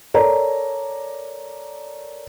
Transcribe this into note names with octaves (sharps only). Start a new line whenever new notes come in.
A4 A#4 C#5 D5 A#5